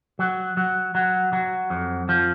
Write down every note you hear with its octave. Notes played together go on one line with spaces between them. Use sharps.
F#3
F#3
F#3
F#3
F2
F3